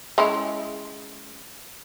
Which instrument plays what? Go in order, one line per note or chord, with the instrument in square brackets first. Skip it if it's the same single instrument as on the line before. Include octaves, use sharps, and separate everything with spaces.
[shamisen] G#3 C#4 E4